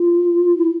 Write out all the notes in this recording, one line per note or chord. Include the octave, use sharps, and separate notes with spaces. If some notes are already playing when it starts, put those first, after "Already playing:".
Already playing: F4
E4